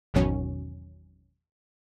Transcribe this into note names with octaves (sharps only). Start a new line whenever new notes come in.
G#1 E2 B2 D#3 F#3 C#4